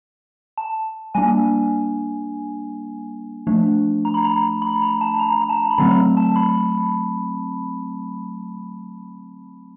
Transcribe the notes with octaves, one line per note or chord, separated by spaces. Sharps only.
A5
G3 A#3 D4 G#5
F3 A3 D4
A#5
B5
A#5
B5
A#5
A5
A#5
A#5
A5
B5
D3 F#3 A3 C4 A#5
A5
B5